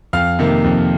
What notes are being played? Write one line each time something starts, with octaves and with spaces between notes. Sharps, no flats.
F2 F5 F6
C3 D#3 A#3
F2